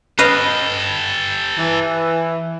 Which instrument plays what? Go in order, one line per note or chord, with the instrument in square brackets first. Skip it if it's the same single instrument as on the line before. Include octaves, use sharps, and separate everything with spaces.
[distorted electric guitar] G4 A4 [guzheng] B4 D#5 F5
[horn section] E3